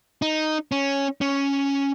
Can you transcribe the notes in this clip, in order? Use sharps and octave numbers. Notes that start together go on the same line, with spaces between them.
D#4
C#4
C#4